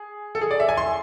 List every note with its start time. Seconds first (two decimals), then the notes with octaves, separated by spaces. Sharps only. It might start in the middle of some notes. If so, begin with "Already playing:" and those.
Already playing: G#4
0.35 A4
0.41 G#4
0.51 D5
0.60 E5
0.69 G#5
0.77 C6